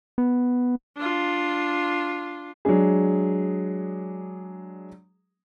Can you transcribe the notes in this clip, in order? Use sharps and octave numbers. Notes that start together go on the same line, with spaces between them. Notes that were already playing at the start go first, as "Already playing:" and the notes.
B3
D4 F4
F#3 G#3 D4 G#4